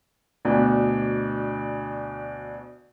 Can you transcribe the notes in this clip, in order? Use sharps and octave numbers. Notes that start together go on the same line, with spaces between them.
D2 B2 D4